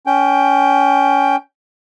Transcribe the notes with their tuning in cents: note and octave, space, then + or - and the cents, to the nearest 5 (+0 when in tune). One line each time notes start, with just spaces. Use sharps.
C#4 +20 G5 +0